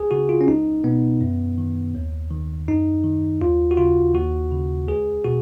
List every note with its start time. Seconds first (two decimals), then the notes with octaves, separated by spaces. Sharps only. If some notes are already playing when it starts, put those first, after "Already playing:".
Already playing: C#2 G#4
0.11 C#3 F#4
0.29 F4
0.41 C#4
0.47 C#2 D#4
0.84 B2 B3
1.21 F#2
1.58 D#3
1.95 D#2
2.30 D#3
2.68 F#2 D#4
3.04 D#3
3.41 D#2 F4
3.71 F#4
3.77 C#3 F4
4.14 D#2 F#4
4.51 C#3
4.88 C#2 G#4
5.24 B2 F#4